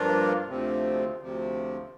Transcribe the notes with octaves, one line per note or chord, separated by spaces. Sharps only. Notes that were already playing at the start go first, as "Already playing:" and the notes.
Already playing: G2 F3 A#3 D4 F4
D2 C3 F3 C4
D2 C3 F3 C4